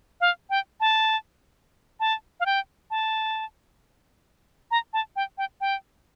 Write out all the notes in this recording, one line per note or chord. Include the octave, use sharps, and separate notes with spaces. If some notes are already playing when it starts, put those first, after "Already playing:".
F5
G5
A5
A5
F5
G5
A5
A#5
A5
G5
G5
G5